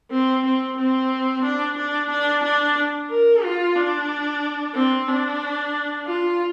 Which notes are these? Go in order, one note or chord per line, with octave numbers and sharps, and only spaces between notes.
C4
C4
C4
D4
D4
D4
D4
A#4
F4
D4
C4
D4
F4